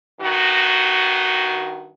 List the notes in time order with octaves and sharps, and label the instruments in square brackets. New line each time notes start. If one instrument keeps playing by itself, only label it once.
[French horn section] G2 D#3 F#4